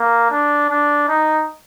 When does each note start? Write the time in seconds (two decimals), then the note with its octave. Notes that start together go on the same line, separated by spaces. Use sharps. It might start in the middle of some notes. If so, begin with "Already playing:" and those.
Already playing: A#3
0.31 D4
0.70 D4
1.09 D#4